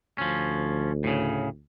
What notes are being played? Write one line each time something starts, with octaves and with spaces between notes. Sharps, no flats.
D2 F3 C#4
A2 C#3